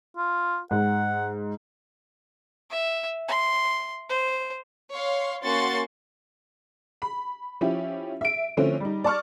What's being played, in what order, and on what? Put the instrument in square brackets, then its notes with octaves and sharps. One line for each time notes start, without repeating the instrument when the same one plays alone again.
[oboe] F4
[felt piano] G#2 [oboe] F#5
[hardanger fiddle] E5
C6
C5
[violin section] C#5 F5 C6
A#3 C#4 F#4 C6 C#6 A6
[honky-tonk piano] B5
F3 C#4 E4 G4
E5 D7
D3 F3 A3 C4 C#4 E4
G3 D#4
D5 A5 C#6 F6